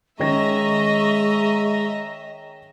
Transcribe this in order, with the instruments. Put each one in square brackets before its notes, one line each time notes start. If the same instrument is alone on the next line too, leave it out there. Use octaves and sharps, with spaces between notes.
[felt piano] D#3 C#4 A#6 [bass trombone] G#3 [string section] D#5 E5 A#5 [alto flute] C#6